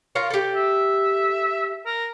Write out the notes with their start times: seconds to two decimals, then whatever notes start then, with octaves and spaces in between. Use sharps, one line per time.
0.15 F4 A#4 C#5
0.30 G4 A4
0.55 E5
1.86 A#4